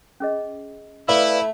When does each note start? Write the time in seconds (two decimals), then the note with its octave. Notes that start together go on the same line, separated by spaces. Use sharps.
0.20 C#4 G#4 D#5
1.09 A3 E4 B4 D5 F5